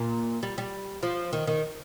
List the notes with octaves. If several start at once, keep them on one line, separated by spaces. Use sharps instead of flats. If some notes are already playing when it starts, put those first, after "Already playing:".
Already playing: A#2
G3
G3
F3
D#3
D#3